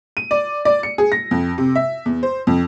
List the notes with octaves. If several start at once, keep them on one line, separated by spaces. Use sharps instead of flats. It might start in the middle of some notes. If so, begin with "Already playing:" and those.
D#7
D5
D5
C#7
G#4
A#6
F2
C3
E5
E2
C5
F2